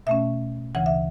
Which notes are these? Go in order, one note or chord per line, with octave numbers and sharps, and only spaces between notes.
B2 A3 C#4 E5
D2 C#3 E3 F#5
E5